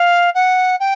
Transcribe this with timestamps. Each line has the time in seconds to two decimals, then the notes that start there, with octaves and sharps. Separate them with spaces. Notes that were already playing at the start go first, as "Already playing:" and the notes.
Already playing: F5
0.35 F#5
0.80 G5